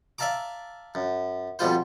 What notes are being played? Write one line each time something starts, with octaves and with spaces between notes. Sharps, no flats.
D5 E5 F5 A5 A#5 D6
F#2
F2 B2 G3 F4 C5